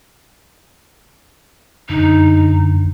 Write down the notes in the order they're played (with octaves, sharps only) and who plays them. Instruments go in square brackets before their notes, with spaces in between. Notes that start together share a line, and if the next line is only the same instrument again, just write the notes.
[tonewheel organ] F#2 D3 [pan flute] D#4